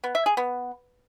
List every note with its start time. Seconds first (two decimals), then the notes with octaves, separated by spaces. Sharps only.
0.04 B3
0.15 E5
0.26 G#4
0.37 B3